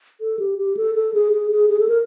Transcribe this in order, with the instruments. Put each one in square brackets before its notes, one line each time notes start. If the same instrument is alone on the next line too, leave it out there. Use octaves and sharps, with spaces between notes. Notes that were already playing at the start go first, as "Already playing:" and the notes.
[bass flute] A4
G4
G4
A4
A4
G#4
G#4
G#4
G#4
A4
A#4